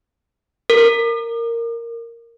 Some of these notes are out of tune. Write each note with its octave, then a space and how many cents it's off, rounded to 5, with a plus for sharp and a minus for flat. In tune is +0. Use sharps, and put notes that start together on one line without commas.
A#4 -10